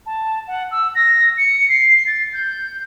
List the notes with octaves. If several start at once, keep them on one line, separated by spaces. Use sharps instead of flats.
A5
F#5
E6
A#6
C#7
C7
A6
G6